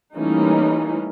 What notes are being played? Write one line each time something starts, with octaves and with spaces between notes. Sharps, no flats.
E3 G3 A3 A#3 C#4 D#4